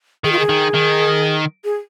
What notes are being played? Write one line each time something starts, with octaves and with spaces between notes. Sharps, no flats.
D#3 G#4
F4
G#4
D#3
D#3
G#4